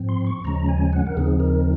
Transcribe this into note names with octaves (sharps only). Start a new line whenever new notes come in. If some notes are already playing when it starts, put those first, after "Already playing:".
Already playing: G#2 F3 C4
C6
C#6
D#2 C#3 F3 G#3 C#4 A#5
G#5
F#5
A#4
D#2 C#3 F3 C4 D#4 G#4
A#4